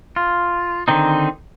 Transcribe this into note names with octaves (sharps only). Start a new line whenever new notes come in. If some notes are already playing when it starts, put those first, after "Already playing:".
F4
D3 D#3 C4 D#4